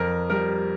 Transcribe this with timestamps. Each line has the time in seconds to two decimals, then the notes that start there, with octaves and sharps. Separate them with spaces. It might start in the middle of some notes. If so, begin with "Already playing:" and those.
Already playing: F2 A#4
0.30 G3 A#4